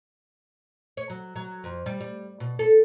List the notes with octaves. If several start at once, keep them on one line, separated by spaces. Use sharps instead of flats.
C#5
F#3
F#3
F2
G3
G3
B2
A4